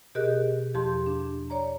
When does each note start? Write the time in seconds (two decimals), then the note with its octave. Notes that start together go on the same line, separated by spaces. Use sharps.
0.15 B2 G4 G#4 A#4 D#5 F#6
0.74 E2 F3 G4 A5 C6
1.06 D4
1.50 C#5 D5 A#5